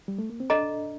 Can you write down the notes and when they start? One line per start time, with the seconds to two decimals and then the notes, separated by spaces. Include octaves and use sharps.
0.08 G3
0.18 A3
0.30 A#3
0.40 C4
0.50 D4 A4 D#5 A#5